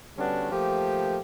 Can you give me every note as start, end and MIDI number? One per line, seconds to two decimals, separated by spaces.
0.18 0.48 50
0.18 0.48 55
0.18 0.48 59
0.18 0.48 61
0.18 0.48 62
0.18 0.48 66
0.51 1.19 53
0.51 1.19 57
0.51 1.19 58
0.51 1.19 67